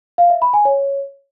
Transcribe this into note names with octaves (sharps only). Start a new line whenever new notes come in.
F5
E5
B5
G#5
C#5